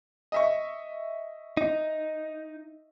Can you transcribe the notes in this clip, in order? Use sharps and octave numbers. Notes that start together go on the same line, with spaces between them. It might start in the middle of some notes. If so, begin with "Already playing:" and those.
D#5 E5 C#6
D#4